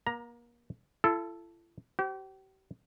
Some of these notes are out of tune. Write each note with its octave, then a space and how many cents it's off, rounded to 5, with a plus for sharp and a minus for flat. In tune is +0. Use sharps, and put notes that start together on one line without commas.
A#3 +35 A#5 +10
E4 +45 A4 +0
G4 -40 C5 +0